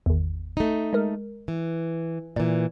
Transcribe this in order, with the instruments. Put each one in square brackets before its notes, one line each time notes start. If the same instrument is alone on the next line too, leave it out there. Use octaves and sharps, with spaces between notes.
[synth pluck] G#1 E2
[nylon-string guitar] A3 D#4
[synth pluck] G#3 A#4
[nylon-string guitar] E3
[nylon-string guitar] A#2 E3 [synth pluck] D5